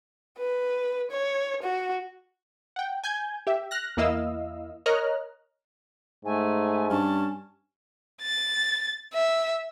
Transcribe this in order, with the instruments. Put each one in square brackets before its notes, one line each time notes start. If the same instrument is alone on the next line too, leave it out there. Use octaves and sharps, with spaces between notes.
[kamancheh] B4
C#5
F#4
[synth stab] F#5 G5
G#5 G6 G#6
G4 E5
F6 F#6 A#6
E2 A#3 E4 D#5 F5 E6
A#4 C#5 D#5 A#5 F6 F#6
[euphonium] G#2 [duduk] A3 [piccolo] G#5
[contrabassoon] G2 [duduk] C#4 [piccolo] A5
[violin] A6
E5